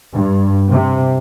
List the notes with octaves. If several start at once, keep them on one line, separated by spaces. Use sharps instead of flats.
G2
C3